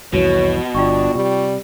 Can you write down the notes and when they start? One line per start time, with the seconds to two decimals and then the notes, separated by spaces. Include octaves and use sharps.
0.13 C2 F2 B2 E3 F#4 C#5
0.75 G1 D4 F4 G5 C#6
1.15 C3 G3